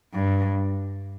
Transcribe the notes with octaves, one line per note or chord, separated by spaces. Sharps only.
G2